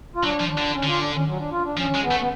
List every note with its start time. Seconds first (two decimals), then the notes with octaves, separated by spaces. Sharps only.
0.15 F4
0.23 F#3 D4
0.40 F3
0.49 D4
0.57 D3
0.74 C#4
0.83 D3 F4
1.00 D4
1.13 C#4
1.26 F#3
1.38 D4
1.51 F4
1.64 D4
1.77 F3 C#4
1.95 G#3
2.03 B3
2.11 A3
2.20 B3